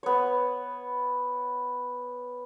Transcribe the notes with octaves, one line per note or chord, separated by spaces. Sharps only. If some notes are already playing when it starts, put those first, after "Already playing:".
B3 C#5